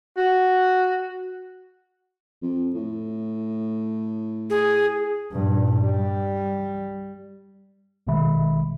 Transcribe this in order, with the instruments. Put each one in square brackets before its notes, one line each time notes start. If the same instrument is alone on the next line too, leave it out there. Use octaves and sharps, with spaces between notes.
[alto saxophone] F#4
[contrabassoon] F2
A2
[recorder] G#4
[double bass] G2 A#2
G3
[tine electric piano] A1 B2 D#3 G#3 E5 B5